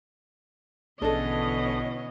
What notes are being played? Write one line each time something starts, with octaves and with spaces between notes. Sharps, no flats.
A#1 B2 D3 E3 C#4 D4 A4 D#5